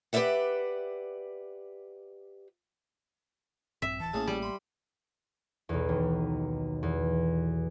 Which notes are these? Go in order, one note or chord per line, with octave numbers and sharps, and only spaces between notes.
G4 B4 C5 D5 E5 F#5
A#1 G2 C4 E5
D1 B1 E3 A5
A1 A2 A3 A#3 C#4 G#4
G3
B5 C6
B1 E2
D#2
E2